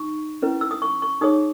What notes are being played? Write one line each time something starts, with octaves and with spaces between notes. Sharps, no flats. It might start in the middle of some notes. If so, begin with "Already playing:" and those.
Already playing: D#4 C#6
C#4 E4 B4
E6
D#6
C#6
C#6
D#4 G#4 C#5 D#6